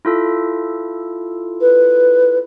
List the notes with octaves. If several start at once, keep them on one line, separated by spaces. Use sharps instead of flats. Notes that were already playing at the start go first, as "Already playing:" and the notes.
E4 F4 A4
B4